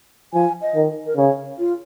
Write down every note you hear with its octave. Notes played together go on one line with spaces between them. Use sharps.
F3 G#5
D#5
D#3
A#4
C#3 C#5
F4